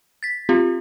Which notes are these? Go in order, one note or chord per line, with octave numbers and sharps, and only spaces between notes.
A6 B6
C4 F4 G4